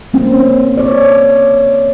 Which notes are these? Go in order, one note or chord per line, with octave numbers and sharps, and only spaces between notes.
A#3 C4 C#4
C#5 D5